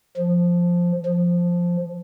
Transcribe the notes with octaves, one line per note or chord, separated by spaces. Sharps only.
F3
F3